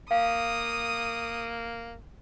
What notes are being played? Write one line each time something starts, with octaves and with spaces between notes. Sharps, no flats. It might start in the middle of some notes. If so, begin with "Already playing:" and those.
A#3 F5 D#6